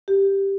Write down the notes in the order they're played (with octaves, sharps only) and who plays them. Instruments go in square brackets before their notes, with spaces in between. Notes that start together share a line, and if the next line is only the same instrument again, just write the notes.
[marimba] G4